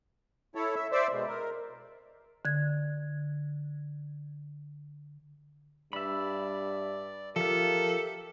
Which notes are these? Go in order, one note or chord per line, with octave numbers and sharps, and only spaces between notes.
E4 A4 C#5
E5
C5 D5 E5
B2 G#3
A#4
D3 G#6
G2 D5 E5 B5
F3 F4 G4 A4 A#4 E5